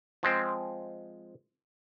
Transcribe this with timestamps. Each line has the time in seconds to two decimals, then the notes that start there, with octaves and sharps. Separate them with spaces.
0.23 F3 G#3 C4